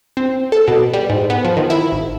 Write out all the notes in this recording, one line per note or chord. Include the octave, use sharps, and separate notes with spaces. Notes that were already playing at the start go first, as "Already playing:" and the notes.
C4
A4
B2
G3
G#2
B3
F3
D#3
E4
G#1